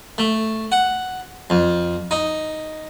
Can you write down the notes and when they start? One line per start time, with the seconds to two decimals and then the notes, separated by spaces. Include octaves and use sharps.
0.18 A3
0.72 F#5
1.50 F2
2.11 D#4